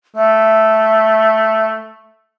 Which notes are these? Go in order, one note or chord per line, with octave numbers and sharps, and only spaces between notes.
A3 E5